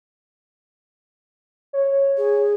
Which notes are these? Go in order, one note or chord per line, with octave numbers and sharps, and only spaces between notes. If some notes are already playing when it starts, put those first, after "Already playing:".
C#5
G#4